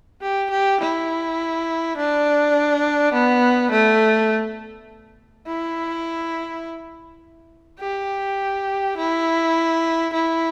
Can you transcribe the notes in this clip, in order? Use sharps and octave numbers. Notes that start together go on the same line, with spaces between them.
G4
G4
E4
D4
B3
A3
E4
G4
E4
E4